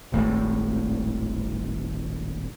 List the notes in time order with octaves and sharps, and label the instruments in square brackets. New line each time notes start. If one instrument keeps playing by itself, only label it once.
[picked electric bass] D#1 G#1 A2 G#3